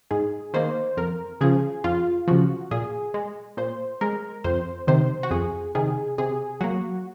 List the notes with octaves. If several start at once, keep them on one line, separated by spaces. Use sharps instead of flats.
G#2 G#4
D#3 A#3 C5
F2 A#4
C#3 F3 G#4
F2 F4
C#3 F3 F#4
A#2 G#4
G#3
A#2 C5
G#3 A#4
F2 C5
C3 D#3 C5
F#4
F2 G#4
C3 D#3 G#4
C3 G#4
F#3 A#3 F#4